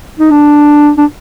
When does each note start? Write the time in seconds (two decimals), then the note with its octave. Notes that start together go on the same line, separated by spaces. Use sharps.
0.20 D#4
0.31 D4
0.98 D4